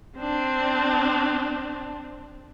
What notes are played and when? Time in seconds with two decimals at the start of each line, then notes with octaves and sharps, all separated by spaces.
0.18 C4 D4